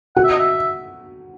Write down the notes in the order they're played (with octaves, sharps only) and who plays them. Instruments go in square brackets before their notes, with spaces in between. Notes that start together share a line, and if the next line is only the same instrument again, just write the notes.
[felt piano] F#4 [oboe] F#5
[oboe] E5
D#5
E5